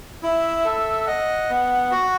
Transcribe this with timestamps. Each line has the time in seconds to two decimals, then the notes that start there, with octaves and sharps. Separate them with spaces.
0.23 E4 E5
0.65 A4
1.07 D#5 F#5
1.49 B3
1.91 F#4